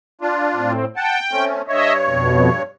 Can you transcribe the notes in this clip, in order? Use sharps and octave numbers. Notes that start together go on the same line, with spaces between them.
D4 F4
A2 C4
F#5 G5 A5
A3 C4 C#4
G2 C#5 D#5 E5
F2 B2